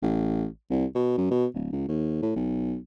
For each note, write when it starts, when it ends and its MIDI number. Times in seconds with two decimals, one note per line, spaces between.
0.03 0.46 33
0.71 0.85 36
0.95 1.13 47
1.18 1.26 42
1.31 1.46 47
1.54 1.68 26
1.72 1.84 37
1.89 2.18 39
2.22 2.31 45
2.36 2.77 35